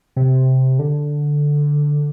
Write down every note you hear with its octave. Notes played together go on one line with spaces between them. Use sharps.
C3
D3